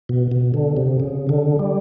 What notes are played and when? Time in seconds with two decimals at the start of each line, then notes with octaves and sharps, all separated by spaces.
0.09 B2
0.32 B2
0.54 D3
0.77 C3
1.00 C#3
1.29 D3
1.59 G3